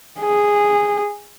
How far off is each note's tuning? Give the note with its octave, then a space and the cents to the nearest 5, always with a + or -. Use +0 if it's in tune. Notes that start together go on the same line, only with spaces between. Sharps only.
G#4 -10